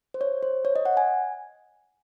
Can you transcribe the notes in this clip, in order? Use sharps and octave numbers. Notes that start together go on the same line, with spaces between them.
C5
C#5
C5
C#5
D#5
F#5
G#5